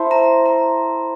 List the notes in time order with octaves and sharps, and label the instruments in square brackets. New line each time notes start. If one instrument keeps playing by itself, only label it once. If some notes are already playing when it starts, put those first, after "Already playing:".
Already playing: [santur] E4 A4 C5
[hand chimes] A#5
A#5